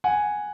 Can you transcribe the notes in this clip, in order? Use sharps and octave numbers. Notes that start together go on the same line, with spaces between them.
F#5 G#5